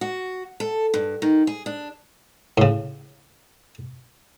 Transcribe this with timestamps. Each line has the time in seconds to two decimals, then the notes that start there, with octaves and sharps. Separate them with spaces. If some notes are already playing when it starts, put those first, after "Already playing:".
0.01 F#4
0.60 A4
0.94 G2
1.22 D#3
1.47 G#4
1.66 D4
2.58 A2 C#3